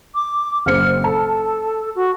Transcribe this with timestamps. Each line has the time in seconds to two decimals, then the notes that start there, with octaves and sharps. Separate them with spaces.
0.15 D6
0.66 F#1 C4 F6 C#7
1.04 A4 A5
1.95 F#4